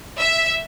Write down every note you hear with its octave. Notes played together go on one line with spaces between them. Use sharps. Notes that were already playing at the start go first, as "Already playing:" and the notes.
E5